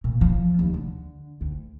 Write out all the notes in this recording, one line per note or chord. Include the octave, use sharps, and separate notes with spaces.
A#2
F3
D#2
D3
D2